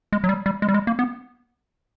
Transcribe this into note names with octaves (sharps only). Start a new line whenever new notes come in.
G#3
F#3
G3
G3
G#3
G3
G#3
A#3
B3